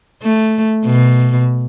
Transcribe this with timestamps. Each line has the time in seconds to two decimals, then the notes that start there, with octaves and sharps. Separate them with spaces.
0.23 A3
0.85 B2